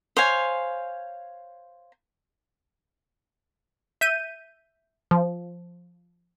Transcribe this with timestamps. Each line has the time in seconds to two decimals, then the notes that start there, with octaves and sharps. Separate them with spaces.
0.17 C5 C#5 F5 G#5
4.01 E5 G6 D#7
5.11 F3